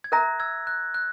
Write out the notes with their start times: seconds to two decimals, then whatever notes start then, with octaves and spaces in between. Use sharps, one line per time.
0.04 G#6
0.12 A#4 E5 A#5 F#6 A#6
0.40 E6 G#6
0.67 F#6
0.94 F#6